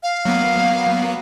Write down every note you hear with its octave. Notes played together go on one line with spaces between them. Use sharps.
F5
F#3 A#3 B3